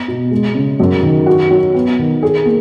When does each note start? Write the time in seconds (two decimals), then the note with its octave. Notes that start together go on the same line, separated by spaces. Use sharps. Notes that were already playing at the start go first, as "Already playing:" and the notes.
Already playing: B3
0.08 B2
0.31 G#3
0.55 C#3
0.80 F#2
1.03 D#3
1.26 F#4
1.50 F#3
1.74 B3
1.99 D#3
2.23 G#4
2.46 A#3